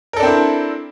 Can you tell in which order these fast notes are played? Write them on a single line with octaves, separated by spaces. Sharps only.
A#4 A4 D4 C4 E4